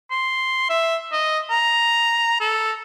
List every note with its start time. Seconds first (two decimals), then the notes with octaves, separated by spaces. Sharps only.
0.11 C6
0.70 E5
1.12 D#5
1.50 A#5
2.40 A4